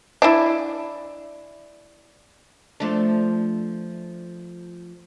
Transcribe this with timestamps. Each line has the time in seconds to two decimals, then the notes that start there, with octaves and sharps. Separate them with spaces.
0.22 D4 E4
2.80 F3 A3 D4